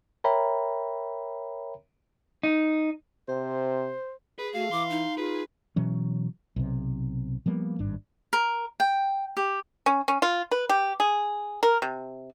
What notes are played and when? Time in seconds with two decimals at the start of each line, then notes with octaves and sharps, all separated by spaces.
0.24 A#4 C#5 E5 G5 A#5 B5
2.43 D#4
3.28 C3 C5
4.39 G#4 B4
4.54 A3 F#4 F5
4.72 E3 C6 D6
4.90 D#4
5.17 F4 G#4 B4
5.76 B2 E3 F#3 C#4
6.56 B1 C3
7.46 F3 G3 A#3 B3
7.79 G#1 G2 D4
8.33 A#4
8.80 G5
9.37 G4
9.86 C#4
10.08 C#4
10.22 F4
10.51 B4
10.69 G4
11.00 G#4
11.63 A#4
11.82 C3